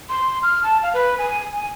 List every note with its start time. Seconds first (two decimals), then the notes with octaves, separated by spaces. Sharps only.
0.09 C6
0.43 F6
0.63 A5
0.83 F5
0.94 B4
1.18 G#5
1.53 G#5